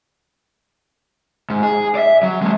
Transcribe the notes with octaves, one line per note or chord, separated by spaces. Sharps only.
G#2
G#4
D5 E5
F#3
G#3 A#3